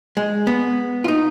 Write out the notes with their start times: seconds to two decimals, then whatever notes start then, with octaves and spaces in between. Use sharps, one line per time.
0.17 G#3
0.47 B3
1.04 F4
1.08 D#4